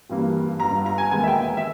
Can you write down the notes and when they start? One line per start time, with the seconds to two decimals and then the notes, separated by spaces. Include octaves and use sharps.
0.09 G#1 G2 E3 G3 A#3
0.60 G1 G2 G3 B3 A#5
0.86 A#5
0.98 G#5
1.10 E1 D#2 D#3 G#3 B3 G#5
1.23 E5
1.28 G5
1.57 E5